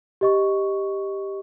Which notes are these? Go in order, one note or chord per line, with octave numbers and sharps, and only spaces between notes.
G4 D#5 C#6